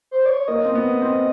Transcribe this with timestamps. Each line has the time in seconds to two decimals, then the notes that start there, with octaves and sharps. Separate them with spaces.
0.11 C5
0.26 D5
0.29 C#5
0.48 A#3 D#5
0.65 C4
0.75 B3
1.02 C4